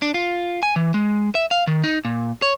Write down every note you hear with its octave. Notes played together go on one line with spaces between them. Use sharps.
D4
F4
G#5
E3
G#3
E5
F5
D#3
D#4
A#2
C#5